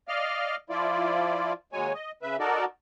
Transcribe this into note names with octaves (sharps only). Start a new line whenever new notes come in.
D5 D#5 F5 F6
F3 E4 F4 D5
D#2 F#3 G#3 C#5 G#5
D#5
C#3 B4 E5
D#4 F#4 A4 A#4 D5